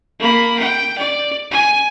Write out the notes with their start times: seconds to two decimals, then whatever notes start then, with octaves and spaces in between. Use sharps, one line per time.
0.20 A#3 B5
0.59 G5
0.98 D5
1.51 G#5